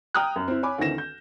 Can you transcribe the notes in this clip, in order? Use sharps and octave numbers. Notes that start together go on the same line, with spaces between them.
G5 A#5 D#6 F6 F#6
F#2
C4 E4
C#5 G#5 B5 D6
D2 D#3 E3 C4 A#6 E7
G6